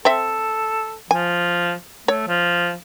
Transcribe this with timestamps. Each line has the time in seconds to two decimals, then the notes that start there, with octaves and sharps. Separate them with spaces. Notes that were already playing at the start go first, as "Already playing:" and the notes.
0.05 C4 A4 E5
1.11 F3 G#5
2.08 A3 C#5
2.28 F3